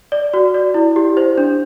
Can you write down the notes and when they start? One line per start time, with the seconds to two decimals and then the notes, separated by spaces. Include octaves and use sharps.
0.12 D5
0.34 F#4
0.54 D5
0.74 E4
0.96 G4
1.17 C5
1.37 D4